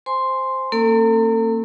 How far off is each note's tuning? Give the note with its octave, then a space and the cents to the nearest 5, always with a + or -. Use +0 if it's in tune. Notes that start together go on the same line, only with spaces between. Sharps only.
C5 +0 G#5 +0 C6 +0
A#3 -35 C#4 -45 A4 +35